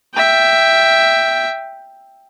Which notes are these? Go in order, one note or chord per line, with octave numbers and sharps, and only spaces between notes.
E5 G5